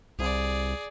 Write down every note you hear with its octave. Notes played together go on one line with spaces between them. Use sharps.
C2 G#4 D5